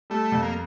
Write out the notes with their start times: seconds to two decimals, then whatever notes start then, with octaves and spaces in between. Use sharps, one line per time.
0.10 G3 A3
0.32 F2
0.43 A#3